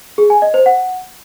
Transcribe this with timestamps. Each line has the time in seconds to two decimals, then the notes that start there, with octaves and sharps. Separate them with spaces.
0.18 G#4
0.30 G#5
0.42 D#5
0.54 C5
0.66 F#5